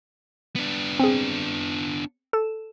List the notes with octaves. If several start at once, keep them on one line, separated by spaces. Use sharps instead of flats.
B3 D4
C4 G#4
A4 E7